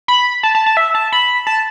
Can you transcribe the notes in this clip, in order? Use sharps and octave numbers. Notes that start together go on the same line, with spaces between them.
B5
A5
A5
A5
E5
A5
B5
A5